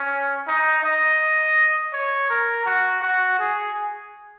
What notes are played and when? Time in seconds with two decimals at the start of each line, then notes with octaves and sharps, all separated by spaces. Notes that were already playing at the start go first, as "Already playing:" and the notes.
Already playing: C#4
0.48 D#4
0.84 D#5
1.93 C#5
2.30 A#4
2.66 F#4
3.02 F#4
3.39 G#4